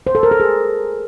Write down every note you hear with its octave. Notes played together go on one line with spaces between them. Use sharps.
C5
A4
A#4
A4
G#4